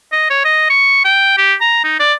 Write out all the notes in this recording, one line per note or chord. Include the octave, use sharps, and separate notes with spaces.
D#5
C#5
D#5
C#6
G5
G4
A#5
D#4
D5